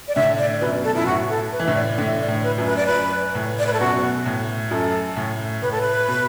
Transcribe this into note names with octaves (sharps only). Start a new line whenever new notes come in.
D5
A2 D3 E5
D5
F#2 B2 B4
A4
F#2 E4
A2 F#4
A4
B4
E3
A2 D3 E5
D5
A2 D3 E5
D5
A2
B4
F#2
B4
D5
F#2 B4
A2
D5
B4
A4
F#2 B2 F#4
A2
F#2 A4
A2
A2 B4
A4
B4
B2